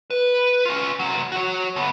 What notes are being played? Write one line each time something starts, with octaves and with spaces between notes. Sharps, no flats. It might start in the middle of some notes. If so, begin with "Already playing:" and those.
B4
C#4 F4
C2 F#3
F#4 C#5
D3 B3